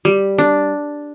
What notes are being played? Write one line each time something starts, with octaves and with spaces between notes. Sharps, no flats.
G3
D4